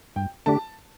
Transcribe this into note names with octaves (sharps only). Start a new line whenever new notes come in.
G2 G5
D3 A3 D4 G4 A5